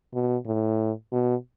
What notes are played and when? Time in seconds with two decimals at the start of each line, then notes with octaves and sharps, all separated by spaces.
0.14 B2
0.46 A2
1.12 B2